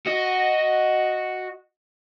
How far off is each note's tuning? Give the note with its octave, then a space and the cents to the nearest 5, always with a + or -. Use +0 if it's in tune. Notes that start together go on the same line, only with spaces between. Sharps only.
F#4 +0 D#5 +0